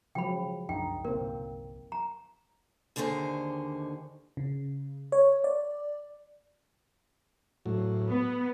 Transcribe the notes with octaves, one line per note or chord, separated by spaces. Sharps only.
C#3 F3 F#3 G5 B5
C2 F#2 D4 D#4 G5
G1 C2 A#3 C4 A#4
A#5
D#2 D3 D#3 G#4 C5
C#3
C#5
D5
A2 F#3
B3 B4